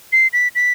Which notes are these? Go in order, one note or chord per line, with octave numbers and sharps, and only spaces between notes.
C7
B6
B6